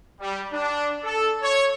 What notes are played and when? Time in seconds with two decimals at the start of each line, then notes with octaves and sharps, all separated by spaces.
0.20 G3
0.52 D4
1.03 A4
1.42 C#5